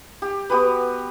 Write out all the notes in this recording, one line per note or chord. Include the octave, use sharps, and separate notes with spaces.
G4
B3 F#4 G4 B4